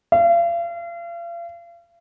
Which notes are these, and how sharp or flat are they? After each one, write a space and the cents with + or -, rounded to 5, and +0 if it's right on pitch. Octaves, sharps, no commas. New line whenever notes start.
F5 -40